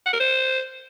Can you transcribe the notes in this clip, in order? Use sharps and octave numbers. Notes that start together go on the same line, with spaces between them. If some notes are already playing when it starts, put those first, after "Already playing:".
F#5
A#4
C5